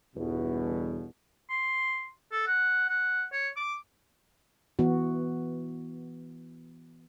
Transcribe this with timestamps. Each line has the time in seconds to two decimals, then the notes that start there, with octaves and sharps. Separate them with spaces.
0.16 G1 E2 B2
1.50 C6
2.32 A4
2.47 F#5
2.89 F#5
3.33 C#5
3.56 D6
4.79 E3 B3 F#4